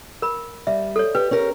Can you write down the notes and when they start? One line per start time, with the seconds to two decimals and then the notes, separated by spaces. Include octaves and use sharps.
0.22 A#4 B5
0.67 G3 E5
0.96 A4 C#5
1.15 G4 B4
1.31 C#4 G4 A#4